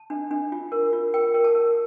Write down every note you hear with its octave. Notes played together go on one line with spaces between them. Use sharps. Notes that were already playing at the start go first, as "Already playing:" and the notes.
Already playing: A5
D4
D4
F4
A#4
F4
A#4 G5
A#4
A5
A#4